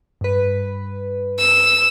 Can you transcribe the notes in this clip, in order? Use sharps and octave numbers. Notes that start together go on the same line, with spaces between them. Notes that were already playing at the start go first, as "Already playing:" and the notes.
G2 B4
E6